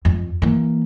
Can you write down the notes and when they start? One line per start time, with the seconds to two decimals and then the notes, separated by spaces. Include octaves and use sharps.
0.05 F2
0.42 E3 A#3